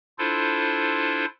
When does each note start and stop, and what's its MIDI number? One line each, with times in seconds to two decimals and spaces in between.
0.19 1.25 62
0.19 1.25 64
0.19 1.25 65
0.19 1.25 69
0.19 1.25 72